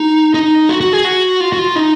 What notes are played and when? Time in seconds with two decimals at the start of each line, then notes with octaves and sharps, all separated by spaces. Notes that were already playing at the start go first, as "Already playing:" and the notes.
Already playing: D#4
0.34 D#4
0.69 F#4
0.80 F#4
0.93 G#4
1.05 F#4
1.40 F4
1.52 F#4
1.59 F4
1.76 D#4